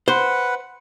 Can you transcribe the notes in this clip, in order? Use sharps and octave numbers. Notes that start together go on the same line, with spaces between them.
B4 C5 F#5